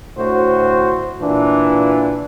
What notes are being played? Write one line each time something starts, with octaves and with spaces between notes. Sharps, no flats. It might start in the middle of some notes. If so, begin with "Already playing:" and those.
D2 A2 F#4 C5
A#2 E3 D4